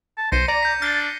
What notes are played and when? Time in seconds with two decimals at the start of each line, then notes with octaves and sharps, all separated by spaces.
0.18 A5
0.32 B1 C5 A#6 C#7 D#7
0.48 D5 A#5
0.63 G6 B6
0.82 D4 F6 A6 C7 G7